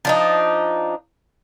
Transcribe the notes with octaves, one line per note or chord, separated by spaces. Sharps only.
F3 D4 D#4